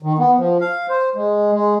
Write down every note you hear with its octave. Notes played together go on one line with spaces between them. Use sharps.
D#3
B3
F3
F5
C5
G#3
G#3